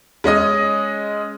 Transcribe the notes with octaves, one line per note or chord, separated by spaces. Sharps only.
G#3 C#4 D#5 D#6